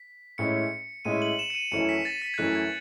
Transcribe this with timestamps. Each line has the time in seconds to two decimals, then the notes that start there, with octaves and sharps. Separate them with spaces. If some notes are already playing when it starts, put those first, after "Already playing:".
Already playing: B6
0.38 A2 G#3 C#4 E4 C#7
1.05 A2 G#3 C#4 E4 D#7
1.22 F#7
1.39 E7
1.50 C#7
1.55 D#7
1.72 F#2 E3 A3 C#4 E4 C#7
1.89 B6
2.05 A6
2.22 B6
2.34 G#6
2.38 F#2 E3 A3 C#4 E4 F#6
2.55 G#6